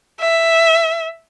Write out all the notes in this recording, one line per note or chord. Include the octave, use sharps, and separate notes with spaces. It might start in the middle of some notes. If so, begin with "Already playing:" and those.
E5